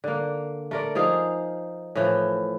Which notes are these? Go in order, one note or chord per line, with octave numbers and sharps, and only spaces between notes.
D3 A#3
A3 A#4 D5
F3 D#4 G#4 F5
A2 E3 F3